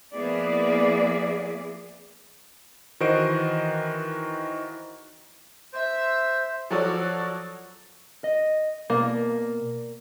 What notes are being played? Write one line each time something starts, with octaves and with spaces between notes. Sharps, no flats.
F3 A#3 B3 E4 G#4 D5
D#3 E3 F#4 C5 D#5 D7
C5 E5
F3 F#3 F#4 A4 C#5 D5
D#5
B2 A#3 D5